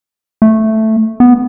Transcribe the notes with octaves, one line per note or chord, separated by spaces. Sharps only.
A3
B3